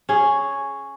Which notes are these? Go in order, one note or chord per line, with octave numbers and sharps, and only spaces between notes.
C#4 G#4